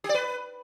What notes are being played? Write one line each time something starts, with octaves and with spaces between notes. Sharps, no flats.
G4
D5
B4